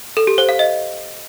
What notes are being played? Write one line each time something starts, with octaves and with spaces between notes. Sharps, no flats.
A4
G4
C5
F5
D#5